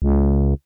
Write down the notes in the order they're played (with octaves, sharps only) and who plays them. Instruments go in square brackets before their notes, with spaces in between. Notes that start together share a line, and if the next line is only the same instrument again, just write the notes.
[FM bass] C#2